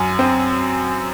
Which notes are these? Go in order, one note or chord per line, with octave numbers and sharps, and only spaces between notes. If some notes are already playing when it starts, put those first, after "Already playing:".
Already playing: F#2 G#5
C4